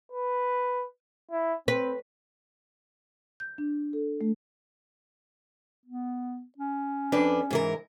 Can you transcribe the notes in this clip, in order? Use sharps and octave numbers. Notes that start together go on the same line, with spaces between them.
B4
E4
C4 B4
G6
D4
A4
A3
B3
C#4
F2 D4 B4
G#2 E3 A#4